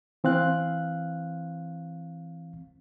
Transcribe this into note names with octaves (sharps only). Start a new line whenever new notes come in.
E3 C4 F5 F#6